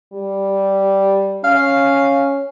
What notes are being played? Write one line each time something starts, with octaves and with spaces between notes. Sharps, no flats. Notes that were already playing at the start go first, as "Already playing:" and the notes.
G3
C#4 F5